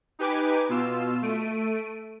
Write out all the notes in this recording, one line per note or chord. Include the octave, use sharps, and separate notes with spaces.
D#4 G4 B4 G#5 D6
B2 F4 E6
A3 D7 D#7